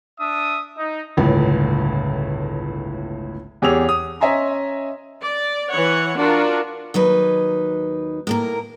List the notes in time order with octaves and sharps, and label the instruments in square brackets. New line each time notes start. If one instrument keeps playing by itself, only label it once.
[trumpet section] D4 E5 D#6
D#4
[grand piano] G1 C#2 A2
E2 G4 G#4 C#5 E6 F7
D#6
C#4 D#5 E5 G#5 A#5 C6
[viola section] D5
E3 C#5 F#5
D4 F4 F#4 A#4
[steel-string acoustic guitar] D#2 F#3 D#4 B4
A2 A#3 A#4